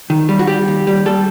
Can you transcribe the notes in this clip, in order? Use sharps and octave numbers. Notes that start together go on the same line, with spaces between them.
D#3
G3
F#4
G3 G4
D#2
G3
G3 A4